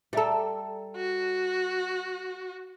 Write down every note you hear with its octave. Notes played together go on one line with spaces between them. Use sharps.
G3 A4 D5 E5 A#5
F#4